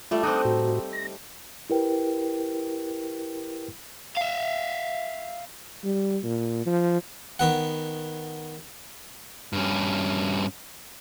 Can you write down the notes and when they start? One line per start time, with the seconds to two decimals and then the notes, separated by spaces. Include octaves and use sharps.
0.11 G3 A3 F4 D5 E5
0.23 C4 D#4 D6 D#6 F#6
0.45 A2 F#4
0.93 A#6
1.70 E4 G4 A#4 B4 G5
4.17 E5 F5
5.84 G3
6.23 A#2
6.66 F3
7.39 D#3 B3 F#5
9.53 G2 C#4